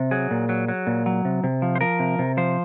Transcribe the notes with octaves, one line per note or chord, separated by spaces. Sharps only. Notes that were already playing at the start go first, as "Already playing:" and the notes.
Already playing: C3
F#3 G#4
A#2
F#3
F#3
A#2
F#3
C3
C3
F3
C5
F3 A#4
C3
C3
F3 C5